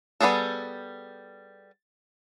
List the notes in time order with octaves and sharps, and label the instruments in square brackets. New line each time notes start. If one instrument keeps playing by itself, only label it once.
[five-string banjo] G3 B3 C#4 G#4 A4